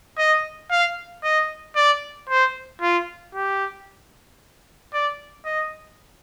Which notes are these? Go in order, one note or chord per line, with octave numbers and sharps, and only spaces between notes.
D#5
F5
D#5
D5
C5
F4
G4
D5
D#5